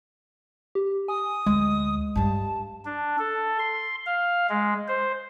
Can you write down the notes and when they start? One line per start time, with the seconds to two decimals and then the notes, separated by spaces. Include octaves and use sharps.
0.75 G4
1.08 G#5 D#6
1.46 D2 G#3
2.16 G2 G3 A5
2.85 D4
3.19 A4
3.59 C6
4.06 F5
4.50 G#3
4.88 C5